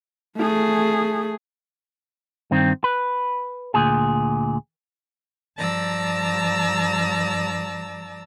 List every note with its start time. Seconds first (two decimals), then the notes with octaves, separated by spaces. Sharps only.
0.37 A3 G#4
2.51 G2 D#3 C4
2.84 B4
3.74 D2 A#2 G#4
5.56 G2 F3 D5 A5 A#5 E6